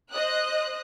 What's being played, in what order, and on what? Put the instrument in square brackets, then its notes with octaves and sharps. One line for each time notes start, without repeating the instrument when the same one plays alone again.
[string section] C5 D#5 D#6 F#6